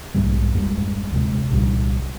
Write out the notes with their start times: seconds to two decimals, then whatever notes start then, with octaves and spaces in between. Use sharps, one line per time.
0.15 B1 G#2 B2 G3
0.54 G#1 F2 G3 G#3
1.12 D#1 C3 G#3
1.52 C2 A#2 G3